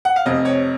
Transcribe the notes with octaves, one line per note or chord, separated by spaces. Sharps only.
F#5
F5
F1 F2 C3 D#5
C#5